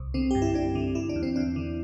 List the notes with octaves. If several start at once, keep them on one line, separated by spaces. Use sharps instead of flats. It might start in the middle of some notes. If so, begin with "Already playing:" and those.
Already playing: C2
D3 C4
G2 G4
E4
G2 D4
D3
D3 E4
D4
E2
C4
E2 D4
D3